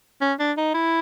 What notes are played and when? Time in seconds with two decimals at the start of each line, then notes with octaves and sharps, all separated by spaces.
0.21 C#4
0.39 D4
0.57 D#4
0.74 E4